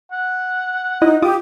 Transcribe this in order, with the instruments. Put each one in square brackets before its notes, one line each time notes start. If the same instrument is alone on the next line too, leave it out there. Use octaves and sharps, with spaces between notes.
[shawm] F#5
[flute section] D#4 [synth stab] E4 D#5
[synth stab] F4 D6 D#6 [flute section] G4